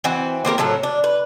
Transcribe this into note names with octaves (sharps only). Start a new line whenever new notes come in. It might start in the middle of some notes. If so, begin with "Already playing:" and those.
E3 C4 F#4
A#3 C4 G4 A#4
A2 F#3 A4 A#4
D4
B4